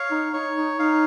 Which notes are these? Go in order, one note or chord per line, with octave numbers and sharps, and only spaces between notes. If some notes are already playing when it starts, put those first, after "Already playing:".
Already playing: C#5 F5
D#4
D#4 C#5
D#4
D#4 F5